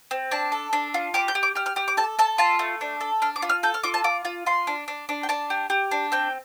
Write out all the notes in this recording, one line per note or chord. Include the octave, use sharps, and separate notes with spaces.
C4
D4 A5
A4
D4
F4
G4 D6
G6
G4
D6
G4 F6
F6
G4 F6
D6
A4 A5
A4 A5
F4 A5
A3
D4
A4
D4 F6
D6
F4
F6
A4 G6
F6
F4 D6
A5
F4 D6
F4
F4 C6
D4
D4
D4
G5
D4 A5
G4
G4
D4
C4 G5